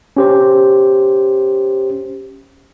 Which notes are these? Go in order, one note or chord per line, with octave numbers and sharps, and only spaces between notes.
C#4 G4 C5